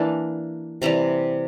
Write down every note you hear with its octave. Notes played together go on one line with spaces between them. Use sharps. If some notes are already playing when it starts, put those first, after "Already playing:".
Already playing: E3 A#3 D4
C3 E3 G3 A#5